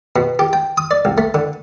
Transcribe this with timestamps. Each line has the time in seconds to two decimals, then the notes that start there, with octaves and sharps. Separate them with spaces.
0.16 B2
0.39 G4
0.53 G5
0.78 D#6
0.91 D5
1.05 C2
1.18 A3
1.34 D3